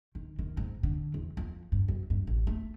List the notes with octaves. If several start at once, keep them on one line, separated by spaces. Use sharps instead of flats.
D#3
D#3
G#2
D3
E2
F2
G2
F#2
G2
A1
A3